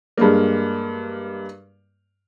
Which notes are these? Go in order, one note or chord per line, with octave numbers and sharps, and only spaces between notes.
G2 G#3 A#3